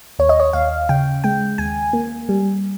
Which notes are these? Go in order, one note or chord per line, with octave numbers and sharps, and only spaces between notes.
D#2 C#5
D#5
C#5
D#2 F5
C#3 G5
G#3 G5
D#2 G#5
A#3
G3